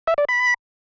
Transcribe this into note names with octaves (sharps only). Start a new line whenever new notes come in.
E5
D5
B5